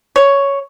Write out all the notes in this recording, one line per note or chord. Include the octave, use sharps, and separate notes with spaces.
C#5